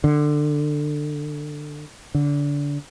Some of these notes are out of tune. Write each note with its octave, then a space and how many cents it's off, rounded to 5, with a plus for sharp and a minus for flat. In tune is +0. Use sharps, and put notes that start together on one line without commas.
D3 +20
D3 -30